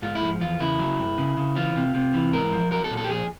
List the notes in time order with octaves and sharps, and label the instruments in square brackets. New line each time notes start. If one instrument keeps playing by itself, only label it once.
[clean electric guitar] G#2 F4
E4
F3
E2 F4
C#3 E4
F#3
G2
C#3
C#3
E3 F4
C3
C3
E3
G#2 A#4
F3
F#3 A#4
A4
A#2
A4
G4
F3 G#4